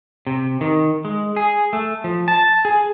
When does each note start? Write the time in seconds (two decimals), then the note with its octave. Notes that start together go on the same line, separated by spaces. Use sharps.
0.27 C3
0.61 D#3
1.05 G#3
1.36 G#4
1.73 A3
2.04 F3
2.28 A5
2.65 G#4